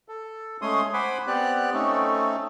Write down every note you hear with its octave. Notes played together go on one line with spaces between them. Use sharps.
A4
G#3 A3 C#4 G#4 C6 D#6
C5 F#5 G#5 B5 C6 D6
B3 C4 G4 D5 F#6
A3 C4 C#4 D#4 A4